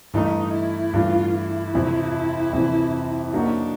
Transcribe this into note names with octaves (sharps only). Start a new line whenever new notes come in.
G2 E3 A3 D#4
E4
G2 E3 A3 F4
E4
F2 C3 E3
F2 C3 E3
F#3 A#3 D4 D#4 F#4